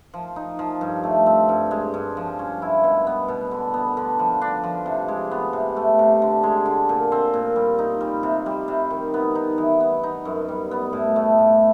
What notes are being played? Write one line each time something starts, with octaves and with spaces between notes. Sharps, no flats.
F3
D#4
F3
G2
A3
C4
G2
G#3
G2
F3
C#4
E4
B2
B3
B2
D3
B3
D3
F3
D4
F3
C3
G#3
B3
C3
A3
C3
D3
G#3
D3
A#2
C4
A#2
G3
D#4
G3
C3
G3
C3
D#3
B3
D#4
E3
B3
D#4
F#2
G3
B3
A2
A3
A2